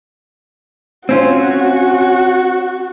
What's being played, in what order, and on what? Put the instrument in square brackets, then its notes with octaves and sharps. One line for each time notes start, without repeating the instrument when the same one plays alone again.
[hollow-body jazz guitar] C4 C#4 F4 [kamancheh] F#4